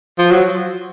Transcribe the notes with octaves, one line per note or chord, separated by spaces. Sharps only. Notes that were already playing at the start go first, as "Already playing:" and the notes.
F3
F#3